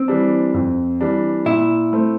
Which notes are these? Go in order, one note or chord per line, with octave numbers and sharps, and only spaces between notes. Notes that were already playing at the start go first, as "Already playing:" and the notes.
Already playing: C4
E3 G3 D4
F2
E3 G3 D4
A#2 E4
A3 C4